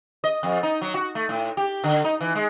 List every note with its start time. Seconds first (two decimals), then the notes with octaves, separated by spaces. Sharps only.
0.24 D#5
0.43 F2
0.63 D#4
0.82 F#3
0.94 F#4
1.15 A3
1.29 A2
1.57 G4
1.84 D3
2.04 D#4
2.21 E3
2.35 G#3